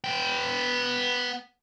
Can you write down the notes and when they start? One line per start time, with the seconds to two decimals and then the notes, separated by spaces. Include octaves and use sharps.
0.04 B3 G5